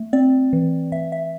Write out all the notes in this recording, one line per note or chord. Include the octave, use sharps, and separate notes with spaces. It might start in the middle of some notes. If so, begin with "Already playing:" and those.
Already playing: A3
C4 D5
E3
E3 E5
E5